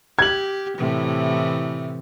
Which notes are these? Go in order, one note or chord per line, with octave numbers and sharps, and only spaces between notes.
G4 G#6 F#7
A2 C3 E3